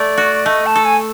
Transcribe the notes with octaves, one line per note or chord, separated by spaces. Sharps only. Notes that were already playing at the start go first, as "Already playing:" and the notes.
Already playing: A3 D5
F#4
A3 D#5
A5
A4
G#5